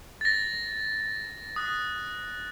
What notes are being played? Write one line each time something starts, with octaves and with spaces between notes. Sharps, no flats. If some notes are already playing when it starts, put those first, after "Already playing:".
A6 A#6
D#6 F#6